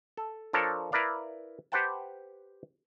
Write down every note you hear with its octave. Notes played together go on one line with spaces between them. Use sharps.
A4
F3 D4 A4 A#4 C#5
E4 A#4 B4 D5 F5
G4 B4 C5 F#5 G5 A5